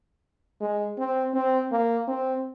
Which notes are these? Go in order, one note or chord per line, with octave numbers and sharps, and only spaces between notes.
G#3
C4
C4
A#3
C4